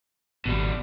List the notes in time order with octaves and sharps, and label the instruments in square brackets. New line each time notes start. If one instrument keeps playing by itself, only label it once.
[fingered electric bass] G#1 [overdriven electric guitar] B2 G3